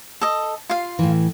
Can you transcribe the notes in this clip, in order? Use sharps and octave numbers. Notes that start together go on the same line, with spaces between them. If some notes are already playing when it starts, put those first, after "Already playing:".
A4 D#5
F4 F5
A2 E3